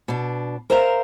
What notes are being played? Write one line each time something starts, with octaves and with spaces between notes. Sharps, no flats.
B2 D4
A#4 C5 E5 F5 A#5